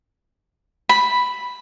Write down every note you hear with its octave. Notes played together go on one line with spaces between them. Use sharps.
B5